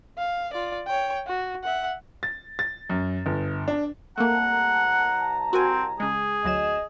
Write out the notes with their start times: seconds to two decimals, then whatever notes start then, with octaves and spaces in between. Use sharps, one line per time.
0.17 F5
0.53 F4 D5
0.87 C#5 G5
1.27 F#4
1.64 E5 F#5
2.23 A6
2.59 A6
2.90 F#2
3.26 G1
3.68 D4
4.18 C2 A3 A#3 F#5 A5 A#5
5.53 C4 F#4 A#4 G#5
6.00 C#3 G#3 G#4
6.44 D2 F#3 D#5 E7